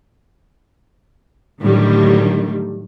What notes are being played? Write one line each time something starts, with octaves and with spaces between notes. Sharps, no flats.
A2 D3 D#3 F#3 G3